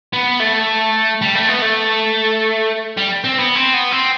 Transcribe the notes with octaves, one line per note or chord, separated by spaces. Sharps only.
B3
A3
G3
A3
B3
A3
G3
C4
B3
C4
B3
C4